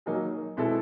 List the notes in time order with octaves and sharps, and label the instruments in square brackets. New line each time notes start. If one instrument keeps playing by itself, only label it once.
[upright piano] D#3 F#3 A#3 D#4 G#4
B2 G#3 C4 E4 A4